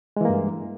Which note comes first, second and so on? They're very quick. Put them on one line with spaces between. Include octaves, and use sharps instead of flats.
G#3 E3 A#3 G2